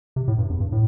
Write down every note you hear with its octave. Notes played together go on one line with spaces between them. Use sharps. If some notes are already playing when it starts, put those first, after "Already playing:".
C3
A2
G2
E2
G2
A2